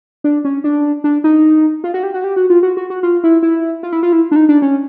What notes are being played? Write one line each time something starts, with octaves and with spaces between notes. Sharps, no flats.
D4
C#4
D4
D4
D#4
F4
F#4
G4
F#4
G4
F#4
F4
F#4
F#4
F#4
F4
E4
E4
F4
E4
F4
E4
D4
D#4
D4
C#4